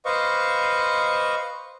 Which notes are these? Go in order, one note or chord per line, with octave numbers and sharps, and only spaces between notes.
B4 C5 D#5 F5 C#6